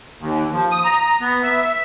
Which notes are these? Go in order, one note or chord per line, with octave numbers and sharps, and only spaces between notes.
D#2
F3
D#6
A#5
B3
E5